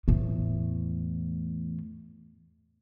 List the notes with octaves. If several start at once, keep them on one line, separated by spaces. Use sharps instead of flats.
E2 A2